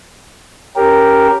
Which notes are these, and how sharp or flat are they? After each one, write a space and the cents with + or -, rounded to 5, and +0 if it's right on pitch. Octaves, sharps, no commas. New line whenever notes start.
C#4 +0 G4 +0 A#4 +0